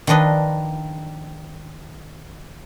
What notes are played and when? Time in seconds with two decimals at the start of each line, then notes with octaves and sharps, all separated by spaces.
0.07 D#3 F3 D4 B4 D#5